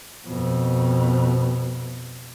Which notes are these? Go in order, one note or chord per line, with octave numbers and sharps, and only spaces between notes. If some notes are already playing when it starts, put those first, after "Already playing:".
F2 B2